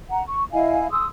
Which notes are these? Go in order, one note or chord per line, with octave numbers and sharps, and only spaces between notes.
F#5 A#5
C#6
E4 D#5 F5 G#5
G#4 C6 D#6 E6